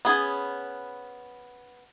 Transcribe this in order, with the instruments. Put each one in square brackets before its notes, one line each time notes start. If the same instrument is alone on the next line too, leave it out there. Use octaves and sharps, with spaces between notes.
[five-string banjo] B3 C#4 G#4